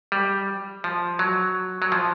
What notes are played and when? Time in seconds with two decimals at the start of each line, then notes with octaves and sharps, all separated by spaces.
0.12 G3
0.84 F3
1.19 F#3
1.82 F#3
1.92 F3